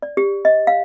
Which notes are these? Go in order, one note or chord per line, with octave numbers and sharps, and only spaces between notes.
D5
G4
D#5
F5